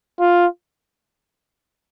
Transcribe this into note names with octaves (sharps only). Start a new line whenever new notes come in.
F4